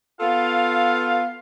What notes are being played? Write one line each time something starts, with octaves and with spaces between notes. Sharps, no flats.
B3 F4 A4 F5